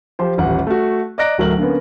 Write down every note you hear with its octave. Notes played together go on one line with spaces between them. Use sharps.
F3 G4 C5
D#1 A1 F#5
A3 F#4
D5 D#5 A#5 F#6 A#6 D7
D1 F#3 A3 A#4 F#7
D3 A#3 B3 C#4